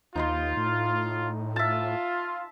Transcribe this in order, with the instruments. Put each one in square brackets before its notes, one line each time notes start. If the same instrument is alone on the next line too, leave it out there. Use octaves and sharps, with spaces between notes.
[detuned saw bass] D#2 [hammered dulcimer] D#4 D#5 C6 [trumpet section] F4
[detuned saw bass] A2
[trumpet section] F4 [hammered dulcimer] E5 A5